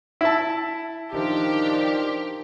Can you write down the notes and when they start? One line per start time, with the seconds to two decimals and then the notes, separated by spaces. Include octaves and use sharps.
0.21 E4 A5
1.12 D#3 F3 D4 G4